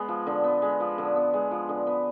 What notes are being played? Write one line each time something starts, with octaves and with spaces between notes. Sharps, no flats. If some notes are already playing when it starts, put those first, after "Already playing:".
Already playing: G#3 B3
F3
D3
B3
G#3
F3
D3
B3
G#3
F3
D3
B3